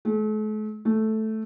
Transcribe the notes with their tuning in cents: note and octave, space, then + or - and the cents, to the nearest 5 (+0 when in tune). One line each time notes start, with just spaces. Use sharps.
A3 -45
A3 -5